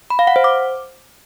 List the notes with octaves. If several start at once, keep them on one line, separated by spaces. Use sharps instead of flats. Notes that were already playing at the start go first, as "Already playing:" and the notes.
B5
F5
F#5
C5
D6